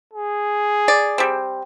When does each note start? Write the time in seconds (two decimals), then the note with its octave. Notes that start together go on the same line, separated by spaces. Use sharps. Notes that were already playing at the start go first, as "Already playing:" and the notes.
0.13 G#4
0.88 D5
1.18 G3 C4